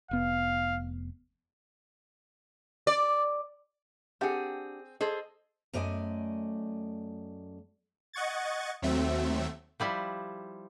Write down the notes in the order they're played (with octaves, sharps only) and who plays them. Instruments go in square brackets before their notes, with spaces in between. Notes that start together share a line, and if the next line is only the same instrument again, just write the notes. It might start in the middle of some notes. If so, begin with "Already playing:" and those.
[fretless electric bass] F1 B3 [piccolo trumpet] F5
[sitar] D5
[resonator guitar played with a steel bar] C4 G#4 [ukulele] D4 G4 F#5
[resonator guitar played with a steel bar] G#4 A4 C5 [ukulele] D#5
[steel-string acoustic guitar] F#2 A3 D5 D#5 G#5
[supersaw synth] D#5 F#5 C#6 G#6 A6
D#2 F#3 A3 C4 E5
[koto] F3 G3 E4